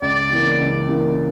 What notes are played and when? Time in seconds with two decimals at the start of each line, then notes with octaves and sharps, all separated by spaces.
0.02 C#2 D5
0.30 C#3 E3 A#3
0.60 C#2
0.88 C#3 E3 A#3